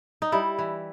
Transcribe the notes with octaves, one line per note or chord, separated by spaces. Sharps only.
D#4
G3 E4
E3